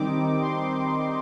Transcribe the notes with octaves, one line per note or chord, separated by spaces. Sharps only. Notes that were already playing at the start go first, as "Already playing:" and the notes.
Already playing: D#3 G3 C4 D#4 D6
C6